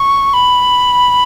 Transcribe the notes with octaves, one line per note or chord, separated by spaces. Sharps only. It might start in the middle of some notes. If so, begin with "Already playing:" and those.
Already playing: C#6
B5